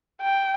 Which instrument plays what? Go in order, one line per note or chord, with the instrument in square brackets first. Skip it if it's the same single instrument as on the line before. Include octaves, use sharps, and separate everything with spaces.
[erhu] G5